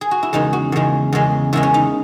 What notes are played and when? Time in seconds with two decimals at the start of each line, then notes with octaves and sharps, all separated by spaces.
0.01 G#4
0.11 F#4
0.23 E4
0.33 E2 C#3 G#3 D#4
0.53 F#4
0.72 E2 C#3 G#3
1.13 E2 C#3 G#3
1.53 E2 C#3 G#3 E4
1.63 C#4
1.74 D#4